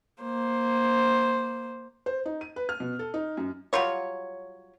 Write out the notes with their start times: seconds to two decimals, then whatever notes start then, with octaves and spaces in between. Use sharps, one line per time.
0.22 A#3 C5
2.06 C5
2.26 D#4
2.41 D#7
2.56 B4
2.69 F6
2.80 B2
2.99 A4
3.14 D#4
3.37 F#2
3.73 F#3 G3 F4 C#5